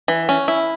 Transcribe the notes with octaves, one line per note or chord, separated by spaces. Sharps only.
E3
C#4
E4